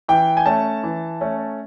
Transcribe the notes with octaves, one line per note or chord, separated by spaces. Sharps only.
E3 G5
G#5
A3 C#4 A5
E3
A3 C#4